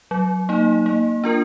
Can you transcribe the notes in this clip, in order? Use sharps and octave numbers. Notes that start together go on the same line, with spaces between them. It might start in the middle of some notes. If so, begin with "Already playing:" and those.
F#3
A#3 D#4
A#3
D4 F4 A#4